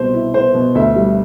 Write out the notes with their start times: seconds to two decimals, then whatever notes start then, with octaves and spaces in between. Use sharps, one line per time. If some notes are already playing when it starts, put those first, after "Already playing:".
Already playing: C2 B2 C5
0.14 E4
0.34 B3 C5
0.54 B2
0.75 D2 E5
0.96 G3